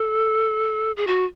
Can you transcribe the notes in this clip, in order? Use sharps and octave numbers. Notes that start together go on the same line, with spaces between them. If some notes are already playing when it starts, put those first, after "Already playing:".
Already playing: A4
G#4
F#4